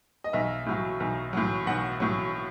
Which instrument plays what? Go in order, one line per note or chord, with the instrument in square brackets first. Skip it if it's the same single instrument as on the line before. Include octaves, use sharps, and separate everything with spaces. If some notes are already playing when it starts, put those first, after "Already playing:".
[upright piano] D#5
B1 E5
A2 F#3
B1
A2 F#3
B1 F#5
A2 F#3